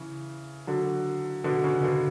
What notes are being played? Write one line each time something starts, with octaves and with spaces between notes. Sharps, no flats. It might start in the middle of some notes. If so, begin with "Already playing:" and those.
Already playing: C#3 E3
D3 F#3
B2 D3
C#3
B2 D3